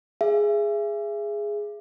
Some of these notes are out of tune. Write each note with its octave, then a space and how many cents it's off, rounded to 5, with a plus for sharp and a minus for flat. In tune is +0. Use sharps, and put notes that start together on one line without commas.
G#4 +0 E5 +30